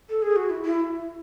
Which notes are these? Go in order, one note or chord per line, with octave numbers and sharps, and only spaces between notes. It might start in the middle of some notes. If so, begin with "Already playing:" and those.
A4
G#4
F#4
E4
E4